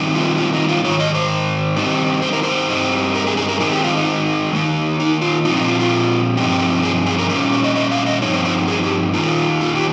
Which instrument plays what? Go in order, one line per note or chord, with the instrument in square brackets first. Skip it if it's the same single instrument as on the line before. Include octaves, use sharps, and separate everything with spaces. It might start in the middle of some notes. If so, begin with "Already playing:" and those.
Already playing: [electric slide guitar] D#3 G3 C4 D#4
F4
F4
D#4
F4
G#2 D#3 C#5
D#5
C5
D#3 G3 C4 D#4
C5
A#4
C5
G2 G3 C4 D#4
A#4
G#4
G#4
A#4
D#3 G#3 C4 D#4 G#4
G4
F4
D#4
D#3 A#3 D#4
D#4
F4
A#2 F3 C4 D#4
D#4
F4
F4
G2 F3 C4 D#4 G4
G#4
G#4
A#4
A#2 G3 A#3 C#4 C5
C#5
D#5
D#5
F5
D#5
G2 F3 C4 D#4 C#5
C5
C5
G#4
G4
D#3 A#3 D#4 F4
F4
G4